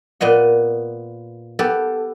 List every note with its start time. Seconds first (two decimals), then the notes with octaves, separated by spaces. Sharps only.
0.21 A#2 B3 D#5 F#5
1.59 B3 G4 A4